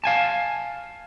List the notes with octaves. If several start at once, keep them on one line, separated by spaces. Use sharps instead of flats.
F5 G#5 A5